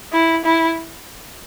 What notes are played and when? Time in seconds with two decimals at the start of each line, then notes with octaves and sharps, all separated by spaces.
0.12 E4
0.45 E4